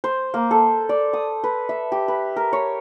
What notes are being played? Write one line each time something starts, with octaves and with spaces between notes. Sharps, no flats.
C5
A#3
A4
D5
D#6
B4
E5
G4
B4
A#4
C#5